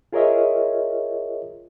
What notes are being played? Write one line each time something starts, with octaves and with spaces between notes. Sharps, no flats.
F4 G#4 A#4 C#5 D#5 E5